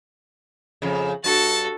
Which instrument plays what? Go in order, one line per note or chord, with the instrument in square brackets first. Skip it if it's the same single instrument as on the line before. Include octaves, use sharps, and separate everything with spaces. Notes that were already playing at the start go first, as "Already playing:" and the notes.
[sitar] F2 C#3
[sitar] G2 [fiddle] F#4 A4 [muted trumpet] A5